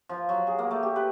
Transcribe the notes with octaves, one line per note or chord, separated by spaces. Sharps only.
F3
F#3
G#4
A#3
A3
G4
B4